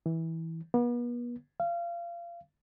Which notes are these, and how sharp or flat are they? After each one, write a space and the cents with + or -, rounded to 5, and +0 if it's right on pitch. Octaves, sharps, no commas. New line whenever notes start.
E3 -15
B3 -40
F5 -25